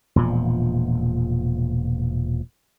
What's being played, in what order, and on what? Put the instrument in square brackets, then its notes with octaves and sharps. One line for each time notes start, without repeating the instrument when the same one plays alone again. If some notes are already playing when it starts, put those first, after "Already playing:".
[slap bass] E1 A#2 F3